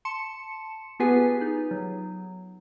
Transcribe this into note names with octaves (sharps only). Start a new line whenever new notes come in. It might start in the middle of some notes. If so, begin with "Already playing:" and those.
A5 C6 C#7 E7
B3 F4 G4 G#4 B4 G#5
D#4
F#3